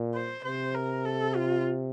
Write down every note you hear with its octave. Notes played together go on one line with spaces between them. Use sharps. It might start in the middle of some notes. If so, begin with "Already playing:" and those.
Already playing: A#2
C5
C3 C5
A#4
A4
F4